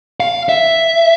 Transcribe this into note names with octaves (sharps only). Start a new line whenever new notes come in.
F5
E5